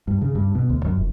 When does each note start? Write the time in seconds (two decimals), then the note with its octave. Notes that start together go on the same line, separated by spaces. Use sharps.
0.08 G2
0.22 C#3
0.35 G2
0.55 B2
0.70 D2
0.85 F#2
0.98 F1